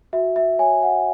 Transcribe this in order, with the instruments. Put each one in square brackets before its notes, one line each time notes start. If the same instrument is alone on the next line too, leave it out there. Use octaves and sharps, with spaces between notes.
[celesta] F#4 E5
E5
C#5 G#5
F#5